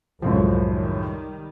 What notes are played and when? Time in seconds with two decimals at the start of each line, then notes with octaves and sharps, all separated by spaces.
0.22 C2 F#2 A2 F3 F#3 G#3
0.65 D#3 G3